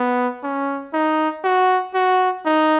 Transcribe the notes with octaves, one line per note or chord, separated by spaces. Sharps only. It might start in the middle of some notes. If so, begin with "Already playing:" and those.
Already playing: B3
C#4
D#4
F#4
F#4
D#4